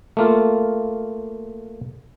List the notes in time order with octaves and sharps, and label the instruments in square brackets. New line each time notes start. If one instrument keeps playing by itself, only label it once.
[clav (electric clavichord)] A3 A#3 F4